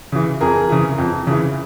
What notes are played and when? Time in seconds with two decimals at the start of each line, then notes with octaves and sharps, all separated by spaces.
0.12 C#3 E3
0.41 F2 G#4 A#4
0.70 C#3 E3
0.98 F2
1.27 C#3 E3